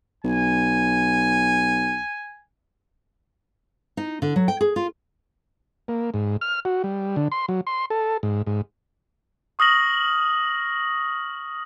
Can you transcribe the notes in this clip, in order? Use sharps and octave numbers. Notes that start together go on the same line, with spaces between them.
B1 G#5
D#4
D3
F#3
G5
G#4
F4
A#3
G#2
F6
F#4
G3
D3
C6
F#3
C6
A4
G#2
G#2
C#6 D#6 F6 A#6 F#7